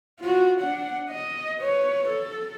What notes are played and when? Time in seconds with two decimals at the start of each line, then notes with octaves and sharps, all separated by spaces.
0.20 F4 F#4
0.61 D4 F#5
1.10 D#5
1.60 B4 C#5
2.09 A4